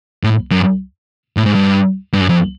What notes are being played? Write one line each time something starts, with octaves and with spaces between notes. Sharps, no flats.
A2
F#2
A2
G#2
G2
G2
F#2
F2